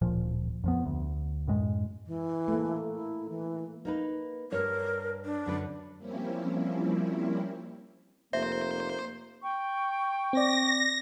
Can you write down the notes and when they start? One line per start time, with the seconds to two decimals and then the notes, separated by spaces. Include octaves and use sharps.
0.01 D1 A#2 F3
0.64 F2 F3 B3
0.86 D2
1.48 F#2 A2 G#3
2.07 E3
2.48 A3 A#3
2.95 E4
3.29 E3
3.85 A#3 D#4 B4
4.52 G2 A#4 C#5
5.25 D4
5.46 F#2 D3 B4
5.97 F3 G3 A#3 C4 C#4 E4
8.33 F1 A#3 C5 E5
9.42 G5 C#6
10.33 C4 D5 A#6